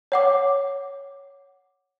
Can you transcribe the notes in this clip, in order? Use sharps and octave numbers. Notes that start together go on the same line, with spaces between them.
C#5 F#5 D6